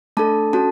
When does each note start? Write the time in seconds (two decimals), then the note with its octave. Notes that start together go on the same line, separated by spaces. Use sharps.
0.17 A3 D4 A4 A5
0.53 C#4 F#4 A4 A5